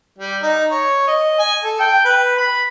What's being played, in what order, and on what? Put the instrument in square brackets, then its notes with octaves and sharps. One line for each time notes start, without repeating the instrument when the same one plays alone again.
[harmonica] G3
D#4
C#5
D#5
G#5
A4
G5
B4
B5